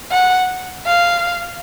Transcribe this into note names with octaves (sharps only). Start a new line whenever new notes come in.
F#5
F5